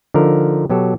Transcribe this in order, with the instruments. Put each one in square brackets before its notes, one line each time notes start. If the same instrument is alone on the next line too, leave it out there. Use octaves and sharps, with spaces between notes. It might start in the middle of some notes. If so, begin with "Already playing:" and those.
[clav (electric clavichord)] D3 F3 D#4 A#4
B2 F#3 G4 A4